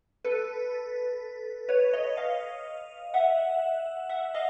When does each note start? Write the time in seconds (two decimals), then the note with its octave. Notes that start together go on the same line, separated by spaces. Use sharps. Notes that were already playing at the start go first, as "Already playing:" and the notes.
0.25 A4 B4
1.69 B4 C#5
1.93 C#5 D#5
2.17 D#5 F5
3.14 E5 F#5
4.09 E5 F#5
4.35 D#5 F5